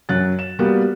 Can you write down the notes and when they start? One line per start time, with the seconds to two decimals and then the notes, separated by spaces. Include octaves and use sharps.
0.09 F#2 F#3 F#6 A6
0.39 E7
0.59 G3 A#3 B3 F#4 G4